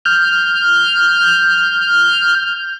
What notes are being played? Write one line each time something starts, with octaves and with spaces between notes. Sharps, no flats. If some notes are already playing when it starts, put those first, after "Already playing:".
F6 G6